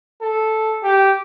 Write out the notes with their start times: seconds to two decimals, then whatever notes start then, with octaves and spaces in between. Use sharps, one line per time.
0.22 A4
0.84 G4